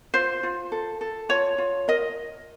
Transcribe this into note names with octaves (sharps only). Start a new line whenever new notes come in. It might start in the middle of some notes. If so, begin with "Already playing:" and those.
F4 C5
F4
A4
A4
F4 C#5
F4
A#4 D#5